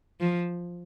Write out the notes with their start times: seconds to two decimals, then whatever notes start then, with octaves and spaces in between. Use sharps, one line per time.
0.20 F3